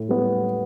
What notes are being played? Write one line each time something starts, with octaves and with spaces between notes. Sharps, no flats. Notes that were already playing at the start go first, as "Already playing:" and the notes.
Already playing: A2
G3 B3